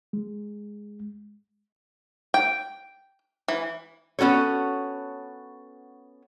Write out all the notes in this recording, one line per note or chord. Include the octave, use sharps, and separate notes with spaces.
G#3
G5
E3
B3 C#4 F#4 A4 C#5